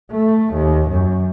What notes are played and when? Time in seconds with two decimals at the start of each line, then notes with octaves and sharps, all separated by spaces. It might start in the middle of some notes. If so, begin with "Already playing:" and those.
0.11 A3
0.54 D#2
0.90 F#2